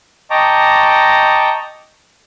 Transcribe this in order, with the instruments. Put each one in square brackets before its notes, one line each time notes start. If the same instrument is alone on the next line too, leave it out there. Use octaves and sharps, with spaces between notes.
[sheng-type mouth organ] D#5 G5 A5 A#5 C#6 D6